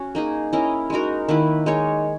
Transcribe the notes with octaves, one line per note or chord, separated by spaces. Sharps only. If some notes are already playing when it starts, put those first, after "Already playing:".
Already playing: C#4 F#4
A#3 D#4 G#4
C#4 E4 A#4 D#5
G#3 D#4 F#4 A#4
D#3 A#3 E4 B4
G#3 D#4 A#4 C#5